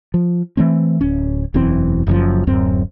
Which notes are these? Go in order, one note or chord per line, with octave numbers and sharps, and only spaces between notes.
F3
E3 A3 C4
D1 C#4
E1 F#2 E3 C4
F#1 F#2 F3
D1 F#2 C4